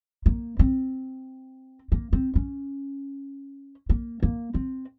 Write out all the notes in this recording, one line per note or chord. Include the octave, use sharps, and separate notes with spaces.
A#3
C4
A#3
C4
C#4
A#3
A#3
C4